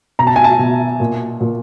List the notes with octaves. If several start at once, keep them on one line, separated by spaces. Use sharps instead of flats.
B2 A#5
A5
G#5
A5
B2
A#2
A#2